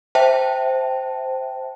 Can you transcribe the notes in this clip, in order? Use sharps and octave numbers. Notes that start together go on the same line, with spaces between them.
C5 E5 G5 A5